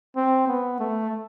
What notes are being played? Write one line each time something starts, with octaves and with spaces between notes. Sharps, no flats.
C4
B3
A3